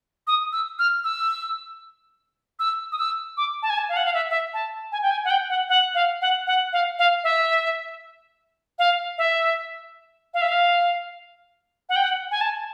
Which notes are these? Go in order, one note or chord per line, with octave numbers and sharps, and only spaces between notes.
D#6
E6
F6
E6
E6
D#6
E6
D6
A5
G#5
A5
F5
F#5
F5
E5
E5
A5
G#5
G5
G#5
F#5
G5
F#5
F#5
F5
F#5
F#5
F5
F5
E5
F5
E5
F5
E5
F5
F#5
G5
F#5
G#5
A5